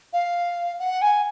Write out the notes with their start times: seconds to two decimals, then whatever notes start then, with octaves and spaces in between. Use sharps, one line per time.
0.13 F5
0.79 F#5
1.02 G#5